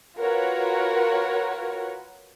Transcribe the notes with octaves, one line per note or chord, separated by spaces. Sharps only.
F4 F#4 A#4 B4 C#5 F#5